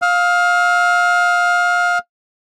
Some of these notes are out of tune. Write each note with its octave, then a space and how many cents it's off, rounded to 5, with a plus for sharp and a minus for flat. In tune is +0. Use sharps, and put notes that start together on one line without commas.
F5 +20 E6 -40